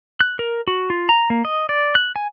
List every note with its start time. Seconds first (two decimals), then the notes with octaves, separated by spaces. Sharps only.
0.21 F#6
0.39 A#4
0.68 F#4
0.90 F4
1.09 A#5
1.30 A#3
1.45 D#5
1.69 D5
1.95 F#6
2.16 G#5